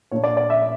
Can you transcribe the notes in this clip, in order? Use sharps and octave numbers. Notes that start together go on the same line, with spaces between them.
A#2 A#3 D4 C#5
D5
D5
E5